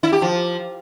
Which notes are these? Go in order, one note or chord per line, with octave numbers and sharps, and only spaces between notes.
E4
G4
F3